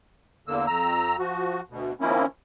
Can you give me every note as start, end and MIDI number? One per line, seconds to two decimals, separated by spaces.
0.48 0.66 40
0.48 0.66 50
0.48 0.66 58
0.48 0.66 88
0.67 1.16 41
0.67 1.16 82
0.67 1.16 88
1.19 1.61 53
1.19 1.61 66
1.70 1.94 38
1.70 1.94 47
2.00 2.26 51
2.00 2.26 53
2.00 2.26 58
2.00 2.26 60
2.00 2.26 61
2.00 2.26 64